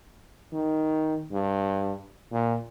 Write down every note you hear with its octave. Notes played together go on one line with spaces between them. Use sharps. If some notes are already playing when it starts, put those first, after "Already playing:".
D#3
G2
A#2